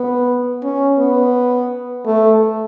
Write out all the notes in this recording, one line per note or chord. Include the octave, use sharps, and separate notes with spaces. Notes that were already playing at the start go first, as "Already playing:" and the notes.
Already playing: B3
C#4
B3
A3